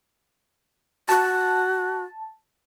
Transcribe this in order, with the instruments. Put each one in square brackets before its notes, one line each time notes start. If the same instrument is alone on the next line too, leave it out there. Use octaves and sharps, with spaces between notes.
[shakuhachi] F#4 [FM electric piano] A5